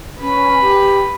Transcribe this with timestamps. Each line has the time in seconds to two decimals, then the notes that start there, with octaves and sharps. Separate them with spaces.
0.20 C#4 B4
0.61 G4